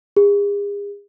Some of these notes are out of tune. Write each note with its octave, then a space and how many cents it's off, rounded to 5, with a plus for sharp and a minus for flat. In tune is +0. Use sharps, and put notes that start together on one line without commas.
G#4 -40